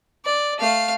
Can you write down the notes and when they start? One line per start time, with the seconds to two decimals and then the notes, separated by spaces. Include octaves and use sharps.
0.25 D5
0.59 A3 F5